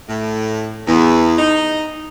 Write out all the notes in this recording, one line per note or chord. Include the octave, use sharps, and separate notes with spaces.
A2
E2
D#4